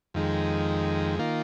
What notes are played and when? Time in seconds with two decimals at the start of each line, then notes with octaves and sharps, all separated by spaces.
0.14 F2 D#3 G#3
1.19 D#3 A#3 F4